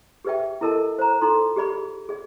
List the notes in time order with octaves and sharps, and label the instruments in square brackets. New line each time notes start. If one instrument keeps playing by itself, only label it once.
[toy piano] G4 G#4 B4 D5 E5 G5
E4 A4 A#4 D#5 A5
C5 A#5
D#4 F4 A4 A#5 C6
G4 G#4 D5 B5
G#4 D5